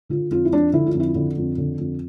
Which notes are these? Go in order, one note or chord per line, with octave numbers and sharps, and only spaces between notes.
D3 F4
F2 F4
E4
F3 D4
D3 E4
F4
F2
E4
D3
F2
D3
F2